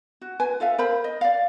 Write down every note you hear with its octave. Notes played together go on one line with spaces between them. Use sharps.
F#4
B4 G#5
F4 A4 E5 F5
A#4 C5 B5
D#5
D5 F5